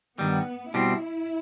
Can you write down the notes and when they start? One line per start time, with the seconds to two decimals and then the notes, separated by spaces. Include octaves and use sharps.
0.19 G2 D#3 G3 B3
0.74 B2 G3 C4 E4